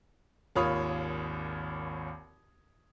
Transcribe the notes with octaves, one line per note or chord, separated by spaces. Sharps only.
G#1 D#2 F4 C#5 B5 D#6